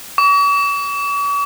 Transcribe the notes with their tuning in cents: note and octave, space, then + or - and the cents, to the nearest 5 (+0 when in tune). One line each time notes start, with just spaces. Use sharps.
C#6 +45